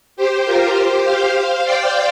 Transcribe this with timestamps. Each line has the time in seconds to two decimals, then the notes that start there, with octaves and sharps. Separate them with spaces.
0.16 G4 C5
0.46 F4 A#4
0.75 G4 C5
1.05 C5 F5
1.64 D5 G5